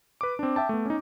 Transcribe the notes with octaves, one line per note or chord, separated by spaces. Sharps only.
B4 D6
C4 D4
E5 G5 A5
A3 B3
C#4 D#4